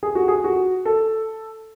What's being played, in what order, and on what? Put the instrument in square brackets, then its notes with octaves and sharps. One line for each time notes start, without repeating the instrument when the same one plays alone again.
[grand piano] G#4
F#4
G#4
F#4
A4